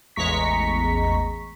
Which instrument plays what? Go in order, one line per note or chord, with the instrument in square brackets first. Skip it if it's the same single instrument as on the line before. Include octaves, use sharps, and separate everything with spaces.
[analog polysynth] A1 E2 G#3 A#5 C#6 B6